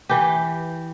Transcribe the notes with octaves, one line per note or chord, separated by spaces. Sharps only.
E3 G4